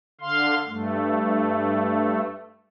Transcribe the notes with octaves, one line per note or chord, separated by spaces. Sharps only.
D3 F5 C6
G2 A3